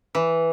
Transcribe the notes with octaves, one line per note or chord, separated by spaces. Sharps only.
E3